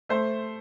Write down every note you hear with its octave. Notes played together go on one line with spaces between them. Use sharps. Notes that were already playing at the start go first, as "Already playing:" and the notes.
A3 C5